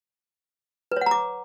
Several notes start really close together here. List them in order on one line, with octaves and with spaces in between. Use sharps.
B4 C#5 F#5 A#5 D6